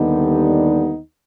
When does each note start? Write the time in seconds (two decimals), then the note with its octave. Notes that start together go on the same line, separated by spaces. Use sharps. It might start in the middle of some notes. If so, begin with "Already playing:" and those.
Already playing: D#2 D3 G3 B3 D#4